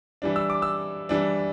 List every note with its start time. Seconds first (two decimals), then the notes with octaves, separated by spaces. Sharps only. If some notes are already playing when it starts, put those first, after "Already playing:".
0.22 E3 G3 D4
0.36 E6
0.50 D6
0.62 E6
1.09 E3 G3 D4